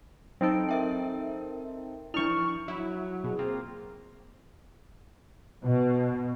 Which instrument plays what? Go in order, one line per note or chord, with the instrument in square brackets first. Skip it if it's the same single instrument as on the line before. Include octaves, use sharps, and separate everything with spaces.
[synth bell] F#3 D7 [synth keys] C4 D#4 A4
[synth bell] A#4 E5 G5
[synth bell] F3 D4 E4 [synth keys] C#6 F6
[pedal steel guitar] F#3 [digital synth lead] E4
[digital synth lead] B2 [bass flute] G#4
[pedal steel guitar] A#3 F4 [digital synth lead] C4
[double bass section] B2